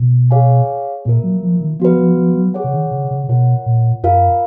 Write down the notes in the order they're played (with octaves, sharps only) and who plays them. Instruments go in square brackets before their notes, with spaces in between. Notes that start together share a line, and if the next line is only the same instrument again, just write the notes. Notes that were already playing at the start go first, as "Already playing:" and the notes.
Already playing: [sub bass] B2
[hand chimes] G#4 C#5 F5 G#5
[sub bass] A#2 [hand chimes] A#3 F4 A#4
[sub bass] F#3
F3
D#3
[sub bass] F3 [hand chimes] B3 F#4 B4
[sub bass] F3
F3
F#3
[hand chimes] G#4 C#5 F#5
[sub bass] C#3
D#3
C#3
C#3
[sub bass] B2 [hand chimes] F4 A#4 C#5 F#5
[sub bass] A#2
[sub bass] F#2 [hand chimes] F4 A#4 F5